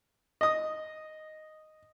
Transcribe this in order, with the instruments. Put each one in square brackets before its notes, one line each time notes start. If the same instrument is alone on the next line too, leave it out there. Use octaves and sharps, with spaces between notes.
[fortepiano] D#5 D#6